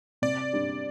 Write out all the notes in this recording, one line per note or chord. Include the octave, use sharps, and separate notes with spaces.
C3 D5
G3 D4